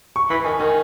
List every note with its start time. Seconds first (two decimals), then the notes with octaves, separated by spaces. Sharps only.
0.16 C#6
0.30 E3 B5
0.44 D#3 G#5
0.59 D#3 G#5